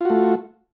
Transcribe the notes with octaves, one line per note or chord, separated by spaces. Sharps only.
A3 F4 F#4